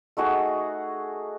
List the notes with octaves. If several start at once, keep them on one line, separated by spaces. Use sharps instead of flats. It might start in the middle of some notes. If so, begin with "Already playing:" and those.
A3 D#4 F#4 G#4